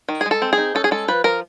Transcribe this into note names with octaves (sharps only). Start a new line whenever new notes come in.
D#3
G#4
G#3
A4
C4
G#4
D#4
C#4 A4
G#4
G#3 A4
F3 B4
F3 A#4